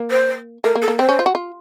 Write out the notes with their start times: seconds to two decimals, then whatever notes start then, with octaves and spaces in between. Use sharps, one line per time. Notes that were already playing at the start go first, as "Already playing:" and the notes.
Already playing: A#3
0.11 C5
0.64 A3 A#4
0.75 A#3
0.82 A4
0.88 A#3
0.99 C4 C5
1.09 C#4
1.19 F4
1.26 F#4
1.35 F4